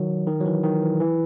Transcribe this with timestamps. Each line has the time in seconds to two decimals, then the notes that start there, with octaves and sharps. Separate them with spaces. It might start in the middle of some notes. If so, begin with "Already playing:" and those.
Already playing: D#3 F#3
0.27 D#3
0.41 F#3
0.45 E3
0.64 D#3
0.83 E3
1.00 E3